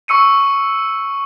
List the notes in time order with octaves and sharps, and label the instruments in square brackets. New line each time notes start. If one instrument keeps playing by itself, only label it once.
[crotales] C#6 E6 C#7 D#7